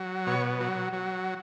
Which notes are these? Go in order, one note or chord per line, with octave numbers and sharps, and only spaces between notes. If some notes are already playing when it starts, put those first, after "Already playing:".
Already playing: F#3
B2 C#5
F#3
F#3